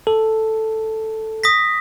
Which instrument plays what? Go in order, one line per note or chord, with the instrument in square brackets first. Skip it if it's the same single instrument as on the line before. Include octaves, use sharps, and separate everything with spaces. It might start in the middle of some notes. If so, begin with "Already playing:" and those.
[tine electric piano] A4
[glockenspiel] D#6 A#6 B6